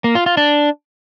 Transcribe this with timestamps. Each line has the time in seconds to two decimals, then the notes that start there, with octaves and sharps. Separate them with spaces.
0.04 A#3
0.15 F4
0.26 F4
0.37 D4